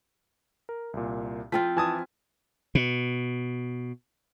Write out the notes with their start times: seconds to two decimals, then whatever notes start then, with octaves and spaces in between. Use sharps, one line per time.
0.69 A#4
0.94 C2 A#2
1.52 F3 C4 F4 B6
1.77 E3 G#5 A5 D#6 G#6
2.75 B2